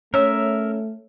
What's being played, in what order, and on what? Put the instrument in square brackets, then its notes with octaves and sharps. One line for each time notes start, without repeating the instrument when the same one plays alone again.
[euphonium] A3 [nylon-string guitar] C#4 [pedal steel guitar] A#4 E5 [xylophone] C#5